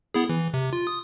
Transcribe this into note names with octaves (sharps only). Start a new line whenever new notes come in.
B3 E4 G#4
E3
C3
F4
D#6